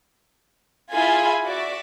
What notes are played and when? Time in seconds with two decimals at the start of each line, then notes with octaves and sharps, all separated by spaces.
0.92 E4 F4 G#4 G#5 B5
1.44 F#4 D5 E5